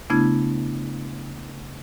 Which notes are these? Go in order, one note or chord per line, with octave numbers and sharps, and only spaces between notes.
C#3 A3 B3 D4 E4 G#6